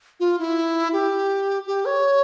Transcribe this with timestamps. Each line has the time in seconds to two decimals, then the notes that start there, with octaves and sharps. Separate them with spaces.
0.20 F4
0.39 E4
0.93 G4
1.67 G4
1.85 C#5